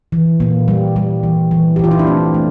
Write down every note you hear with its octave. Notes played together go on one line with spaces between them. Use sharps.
E3
A#2 A#3
G3
G3
E3
E3
G4
E3 F4
E4
D4
A3 C4
A3